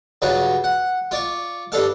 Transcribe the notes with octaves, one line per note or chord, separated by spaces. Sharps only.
G2 C#3 F#3 F4 F#4
F#5
F4 D5 C#6
G2 D4 A4 F5